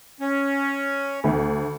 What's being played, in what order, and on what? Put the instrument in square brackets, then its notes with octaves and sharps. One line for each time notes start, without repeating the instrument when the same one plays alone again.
[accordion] C#4
[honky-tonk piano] D2